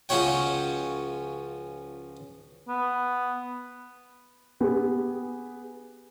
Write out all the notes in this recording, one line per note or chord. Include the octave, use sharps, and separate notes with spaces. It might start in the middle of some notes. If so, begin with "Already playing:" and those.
C#2 F3 C#4 F#4 C#5 G5
B3
B3 G4 G#4